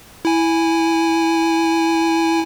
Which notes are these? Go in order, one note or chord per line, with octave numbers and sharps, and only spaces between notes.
E4 G#5